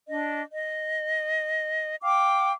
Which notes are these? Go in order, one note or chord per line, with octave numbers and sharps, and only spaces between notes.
D4 D#5
D#5
F5 G5 D6